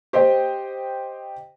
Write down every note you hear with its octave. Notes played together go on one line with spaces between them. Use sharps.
G4 C5 D#5 G5